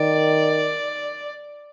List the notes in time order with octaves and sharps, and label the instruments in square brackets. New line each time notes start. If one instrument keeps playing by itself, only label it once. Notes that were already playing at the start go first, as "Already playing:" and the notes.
Already playing: [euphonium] D#3 [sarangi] D5